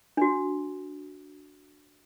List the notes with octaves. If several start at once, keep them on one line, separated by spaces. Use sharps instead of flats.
D4 F#4